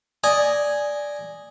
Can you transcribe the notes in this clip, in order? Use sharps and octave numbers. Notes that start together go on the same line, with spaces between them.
D5 D#5 G#5